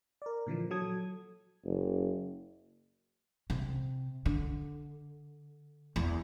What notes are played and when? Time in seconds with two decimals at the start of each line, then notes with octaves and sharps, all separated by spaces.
0.22 A#4 D5
0.46 A#2 D3 E3 F3
0.71 F#3 A4 D#6 G#6
1.65 F#1
3.50 C3
4.26 D3
5.96 E2